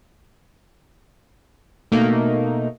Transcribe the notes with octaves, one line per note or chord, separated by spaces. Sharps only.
B2 A3 A#3 D#4